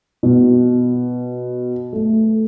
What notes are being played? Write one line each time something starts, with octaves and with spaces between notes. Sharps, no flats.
B2
A3